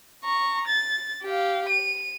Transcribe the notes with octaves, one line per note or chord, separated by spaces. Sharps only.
A#5 C#6
A6
G4 F5
D#7